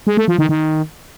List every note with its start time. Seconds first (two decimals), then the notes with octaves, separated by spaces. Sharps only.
0.07 G#3
0.17 A3
0.28 F3
0.39 D#3
0.49 D#3